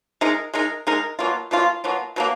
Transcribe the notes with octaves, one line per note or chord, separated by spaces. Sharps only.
G#3 D#4 A#4
G#3 D#4 A#4
G#3 D#4 A#4
B2 F#3 A#3 F4
B2 F#3 A#3 F4
B2 F#3 A#3 F4
B2 F#3 A#3